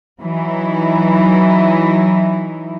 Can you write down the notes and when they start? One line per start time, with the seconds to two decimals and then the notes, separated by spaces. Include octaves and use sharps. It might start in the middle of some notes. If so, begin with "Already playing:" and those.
0.21 E3 F#3 D#4 E4